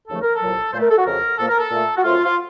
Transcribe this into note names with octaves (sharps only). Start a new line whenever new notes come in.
D#2 C#3 F3 A3 A4
A#4
A4
C2 A#2 F#3
A#2 A3 A#4 C5
A4
F#4
F2 C#3 F3 A#4
A#2 F3 A#3 A4
A#4
A4
A#2 A3
F#4
F#2 F3 A3 F4
F4